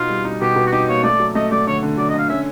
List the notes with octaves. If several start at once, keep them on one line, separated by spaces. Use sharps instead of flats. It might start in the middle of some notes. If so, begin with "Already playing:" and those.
Already playing: B2 D#4 F4
G3
D#4
B2 G4
B2
F#4
D#4 G4
A#3 C#5
A3 D5
F#3
A3 D#5
A3 D5
D3 C#5
D3
F#3 D5
D#5
D3 F5
C#4 E5